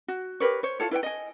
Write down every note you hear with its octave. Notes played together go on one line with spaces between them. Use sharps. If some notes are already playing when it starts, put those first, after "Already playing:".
F#4
G4 A#4 B4 C#5
C5 C#5
E4 F4 A4 C#5
E4 B4 E5 G5
D#5 G#5